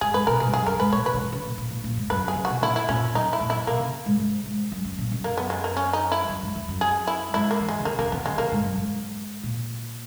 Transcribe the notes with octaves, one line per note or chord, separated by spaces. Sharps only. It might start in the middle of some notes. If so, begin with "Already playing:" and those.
G#2 G#4
G#2 B4
B2 A#4
A#2 G#4
G#2
F#2 G#4
F#2 A#4
G#2 B4
A#2 C#5
B2 B4
C#3
D#3
C#3
A#2
A#2
A#2
A#2
G#2
F#2 B4
D#3
G#4
C#3
B2 F#4
A#2 E4
E4
A#2 C#4
F#2 D#4
E4
A#2
E4
B2 A#3
C#3
G#2
G#2
G#2
F#2
F#2
A#2
F#2
A#3
B3
G#3
A#3
C#4
D#4
E4
F#2
G#2
E2
F#2
G#4
E4
G#2 E4
A#3
E3
G#3
C#3
D#3 A#3
C#3 A#3
E3
D#3 B3
C#3 G#3
D#3 A#3
G#2
F#2
G#2
A#2